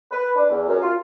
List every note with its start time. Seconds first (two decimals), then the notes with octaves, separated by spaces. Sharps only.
0.11 B4
0.36 D4
0.50 E2
0.67 F#2
0.81 F4